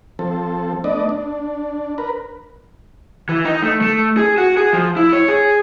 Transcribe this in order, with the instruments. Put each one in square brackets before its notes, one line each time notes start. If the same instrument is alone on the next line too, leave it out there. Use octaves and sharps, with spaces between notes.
[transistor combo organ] F3 C4 A4
A3 B3 D4 D5 D#5
D4
A#4 B4
[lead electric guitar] E3
D#4
A3
A3
G#4
F#4
G#4
F3
E4
C#5
G#4